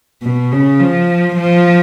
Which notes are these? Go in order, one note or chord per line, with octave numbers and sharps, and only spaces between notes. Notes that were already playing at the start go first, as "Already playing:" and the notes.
B2
C#3
F3
F3